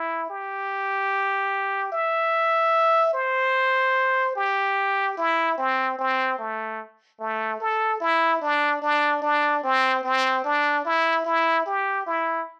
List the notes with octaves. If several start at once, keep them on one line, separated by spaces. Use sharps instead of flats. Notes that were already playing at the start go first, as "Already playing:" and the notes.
Already playing: E4
G4
E5
C5
G4
E4
C4
C4
A3
A3
A4
E4
D4
D4
D4
C4
C4
D4
E4
E4
G4
E4